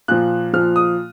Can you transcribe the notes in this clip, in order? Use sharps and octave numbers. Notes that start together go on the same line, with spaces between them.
A#2 F3 F#6
A#2 F3 F6
D#6